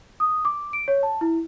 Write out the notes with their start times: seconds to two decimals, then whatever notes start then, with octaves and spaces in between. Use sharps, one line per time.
0.20 D#6
0.45 D6
0.73 D7
0.88 C#5
1.03 A5
1.21 E4